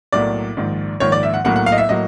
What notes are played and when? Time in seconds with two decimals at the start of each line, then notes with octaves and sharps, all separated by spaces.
0.12 B1 A2 F#3 A#3 D5
0.57 A#1 G#2 D#3
1.00 A#1 G#2 D#3 C#5
1.12 D5
1.23 E5
1.34 F#5
1.44 B1 A2 F#3 A#3 F#5
1.56 F#5
1.66 F5
1.72 D#5
1.78 E5
1.89 A2 F#3 A#3 D#5